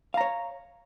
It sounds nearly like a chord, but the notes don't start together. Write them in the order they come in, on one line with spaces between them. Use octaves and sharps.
F5 A#5 C#5